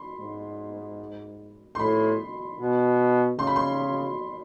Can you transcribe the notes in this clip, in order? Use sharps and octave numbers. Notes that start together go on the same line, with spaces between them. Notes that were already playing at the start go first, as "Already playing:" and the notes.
Already playing: B5 C6
G#2
C6
A2 B5
B2
C#3 C6
B5
C6